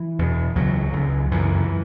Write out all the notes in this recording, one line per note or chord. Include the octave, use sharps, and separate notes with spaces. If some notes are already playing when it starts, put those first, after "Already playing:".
Already playing: E3
E2 B2
C#2 C#3 F#3
C#2 C#3
F#2 C#3 E3